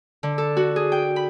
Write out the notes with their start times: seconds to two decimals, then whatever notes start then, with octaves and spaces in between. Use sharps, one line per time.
0.23 D3
0.38 A4
0.57 F#4
0.76 G#4
0.92 G5
1.16 B5